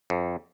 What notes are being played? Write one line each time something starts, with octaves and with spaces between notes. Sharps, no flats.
F2